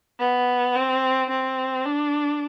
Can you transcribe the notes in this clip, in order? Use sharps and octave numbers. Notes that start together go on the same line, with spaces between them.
B3
C4
C4
D4